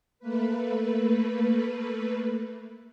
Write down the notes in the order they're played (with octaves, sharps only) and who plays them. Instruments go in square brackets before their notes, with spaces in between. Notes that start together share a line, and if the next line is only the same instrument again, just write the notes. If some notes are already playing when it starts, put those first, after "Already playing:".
[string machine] A3 A#3 B4